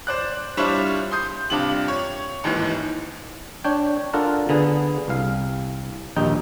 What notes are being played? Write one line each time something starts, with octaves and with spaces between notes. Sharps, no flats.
C5 D5 F#6
G3 D4 E4 F4 C5 C#5
C6 D#6 G6
G2 C3 D4 F4 G4 F#7
C#5
A1 D#2 G#2 E3
D4 C#5 G5
D4 F4 A4 A#4 F#5
D3 B3 G#4
C2 F5
A#1 D#2 D#4 G5